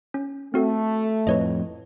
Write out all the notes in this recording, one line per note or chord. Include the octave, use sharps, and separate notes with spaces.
C#4
A3 C4 F#4 A4
F2 A2 B4 C#5 D#5